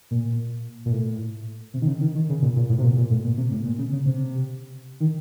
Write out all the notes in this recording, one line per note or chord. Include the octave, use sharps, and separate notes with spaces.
A#2
A#2
A2
C3
D#3
C#3
D#3
D#3
C#3
A#2
A#2
A2
C3
A#2
A#2
A2
A#2
C3
A2
A#2
C#3
C#3
C3
D#3